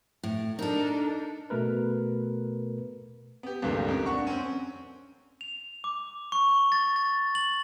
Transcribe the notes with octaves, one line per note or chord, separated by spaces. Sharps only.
A2
D4 D#4 A4 A#4
B2 A3 A#4 B4
B3 G4
C#2 G2 A#2 D#3 G3 A3
F2 A#4
D4 F#5 C#6
C4 C#4
F7
D6
C#6
G7
A6
A6
F#7